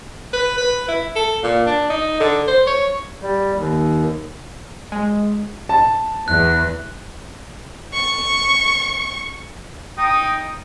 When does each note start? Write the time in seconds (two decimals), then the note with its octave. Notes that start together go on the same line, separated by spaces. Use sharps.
0.33 B4
0.57 B4
0.88 E4
1.15 A4
1.43 A#2
1.66 D4
1.90 D#4
2.20 D3
2.47 C5
2.67 C#5
3.22 G3
3.58 D#2
4.92 G#3
5.69 A5
6.28 E2 F#6
7.93 C#6
9.98 D#4 G5 D#6